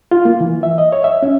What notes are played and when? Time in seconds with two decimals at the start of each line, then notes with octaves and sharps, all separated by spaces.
0.11 F4
0.25 A#3
0.40 E3
0.63 E5
0.78 D#5
0.92 C#5
1.04 E5
1.22 C#4